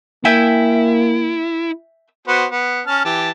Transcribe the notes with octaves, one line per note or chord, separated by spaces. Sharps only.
A#3 E4 E5 G5 G#5
B3 F#4 C5
B3
C#4 A5 F6
E3 G4 A5